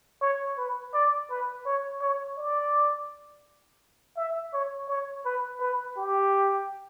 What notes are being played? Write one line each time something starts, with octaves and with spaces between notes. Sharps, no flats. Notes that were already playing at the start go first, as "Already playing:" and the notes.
C#5
B4
D5
B4
C#5
C#5
D5
E5
C#5
C#5
B4
B4
G4